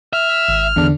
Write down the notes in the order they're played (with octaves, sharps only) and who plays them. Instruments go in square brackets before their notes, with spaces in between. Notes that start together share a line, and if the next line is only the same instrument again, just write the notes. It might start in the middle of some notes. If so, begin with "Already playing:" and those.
[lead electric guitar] E5 [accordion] F6
[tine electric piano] G#1
[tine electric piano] E2 [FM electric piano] D3 D4